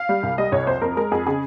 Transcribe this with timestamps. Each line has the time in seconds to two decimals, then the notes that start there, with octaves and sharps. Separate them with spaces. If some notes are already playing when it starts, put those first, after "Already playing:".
Already playing: F5
0.09 G3
0.23 C2
0.38 G3 D#5
0.52 C2 C#5
0.67 F2 C5
0.81 F2 A#4
0.97 G#3 A#4
1.12 F2 G#4
1.26 C#3 G#4